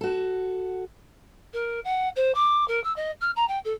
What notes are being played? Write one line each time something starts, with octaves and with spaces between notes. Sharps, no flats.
F#4 A4
A#4
F#5
C5
D6
A#4
E6
D#5
F6
A#5
G5
A4